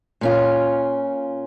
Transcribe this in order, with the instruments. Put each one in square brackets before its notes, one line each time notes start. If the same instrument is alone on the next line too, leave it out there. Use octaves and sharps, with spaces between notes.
[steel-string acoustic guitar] A#2 C#4 F4